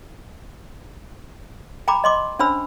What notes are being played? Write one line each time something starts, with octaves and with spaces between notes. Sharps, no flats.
G5 A#5 B5 D6
D#5 C6 D6
C#4 D4 C5 B5 E6